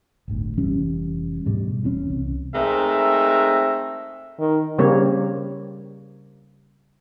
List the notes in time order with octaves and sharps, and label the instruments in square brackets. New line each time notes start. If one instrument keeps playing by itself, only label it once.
[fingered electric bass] D1 G1 D2
F1 E3 G3 C#4
D2 G#2 B2 G3
E1 E3 C4 C#4
C2
[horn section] G#3 A3 C4 D#4 A#4 E5
[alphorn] D#3
[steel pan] C#3 G3 A#3 C4 C#5